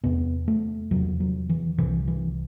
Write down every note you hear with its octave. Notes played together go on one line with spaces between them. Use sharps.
E2 C3 B3
A3
E2 C3 F#3
F#3
E3
C2 C3 E3
E3